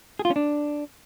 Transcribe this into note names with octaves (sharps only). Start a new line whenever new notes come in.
G#4
F4
C#4
D4